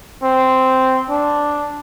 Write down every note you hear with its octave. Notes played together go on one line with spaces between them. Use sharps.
C4
D4